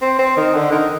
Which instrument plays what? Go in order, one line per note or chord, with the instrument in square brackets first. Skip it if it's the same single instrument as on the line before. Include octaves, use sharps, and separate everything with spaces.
[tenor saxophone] C4
C4
D#3
D3
D#3